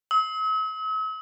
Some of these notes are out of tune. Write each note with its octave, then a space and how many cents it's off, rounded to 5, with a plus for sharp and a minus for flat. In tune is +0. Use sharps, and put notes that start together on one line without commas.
E6 -45